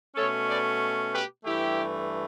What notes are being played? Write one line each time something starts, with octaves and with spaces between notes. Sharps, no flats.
B2 A3 C#4 A4 C#5
B4 D5
G4 B4
G2 E3 A3 E4 G4